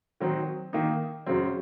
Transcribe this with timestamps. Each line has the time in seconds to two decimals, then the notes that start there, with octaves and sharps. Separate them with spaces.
0.20 D#3 F#3 C4 D#4
0.73 D#3 A#3 D#4
1.26 F#2 C#3 F#3 C4